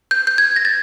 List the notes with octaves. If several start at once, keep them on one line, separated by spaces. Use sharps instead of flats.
G6
G6
G#6
A#6
A6